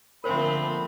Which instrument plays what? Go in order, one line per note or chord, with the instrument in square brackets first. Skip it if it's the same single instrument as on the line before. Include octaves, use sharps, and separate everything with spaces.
[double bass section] D3 A#3 [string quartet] F3 A3 C4 [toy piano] A#4 C5 [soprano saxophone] B5